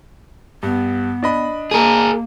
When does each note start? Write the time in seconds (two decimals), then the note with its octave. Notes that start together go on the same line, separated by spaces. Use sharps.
0.63 G2 B3
1.23 D4 D#5 B5
1.71 A#3 G#4 A#4